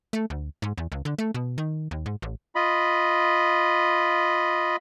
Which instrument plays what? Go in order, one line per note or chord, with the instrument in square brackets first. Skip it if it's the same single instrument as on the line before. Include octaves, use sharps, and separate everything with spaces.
[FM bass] A3
D2
G#2
E2
C#2
D3
A3
B2
D#3
D#2
G#2
A1
[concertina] F4 D#5 B5